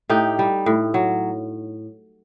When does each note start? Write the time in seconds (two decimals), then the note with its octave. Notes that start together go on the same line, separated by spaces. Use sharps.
0.09 A2 D#4 G4
0.39 G3
0.66 A2
0.94 F#3